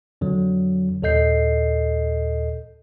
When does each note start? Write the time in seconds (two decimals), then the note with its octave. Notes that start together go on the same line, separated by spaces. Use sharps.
0.21 F2 D3 F#3
1.02 D#2 A#2 A4 D#5 G6 C7